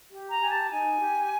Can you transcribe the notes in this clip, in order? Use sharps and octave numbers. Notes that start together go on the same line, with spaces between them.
G4
A#5
G4 G#5
A5
D#4 G#5
G4